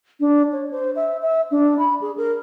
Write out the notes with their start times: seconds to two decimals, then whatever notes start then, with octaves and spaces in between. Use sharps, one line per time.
0.20 D4
0.52 C#5
0.71 C5
0.96 E5
1.22 E5
1.51 D4
1.79 B5
2.01 G#4
2.17 A#4